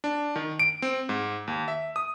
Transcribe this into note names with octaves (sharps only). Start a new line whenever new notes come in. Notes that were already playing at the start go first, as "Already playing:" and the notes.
D4
D#3
D7
C4
G#2
D#2
E5
D#6